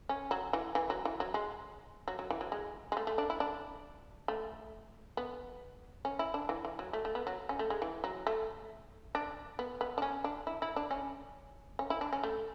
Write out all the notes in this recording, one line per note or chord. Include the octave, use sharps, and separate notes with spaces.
C#4
F#3
E3
E3
F#3
E3
F#3
G#3
F#3
F#3
E3
F#3
G#3
G#3
A3
A3
D4
E4
D4
A3
B3
C#4
E4
D4
E3
E3
F#3
A3
A3
B3
F#3
C#4
A3
G#3
E3
F#3
A3
D4
B3
B3
D4
C#4
D4
E4
E4
D4
C#4
C#4
E4
D4
C#4
A3